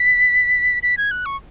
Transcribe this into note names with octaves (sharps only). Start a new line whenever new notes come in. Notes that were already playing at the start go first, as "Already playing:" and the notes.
Already playing: B6
B6
G#6
F#6
C#6